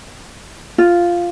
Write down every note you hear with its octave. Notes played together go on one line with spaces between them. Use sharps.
F4